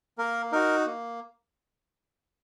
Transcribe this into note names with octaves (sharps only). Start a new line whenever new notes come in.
A#3 A#4
D#4 F#4 A#4
A#3